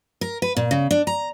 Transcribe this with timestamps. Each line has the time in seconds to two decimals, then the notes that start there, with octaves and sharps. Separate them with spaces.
0.21 A#4
0.42 B4
0.56 A#2
0.71 C#3
0.91 D4
1.07 A#5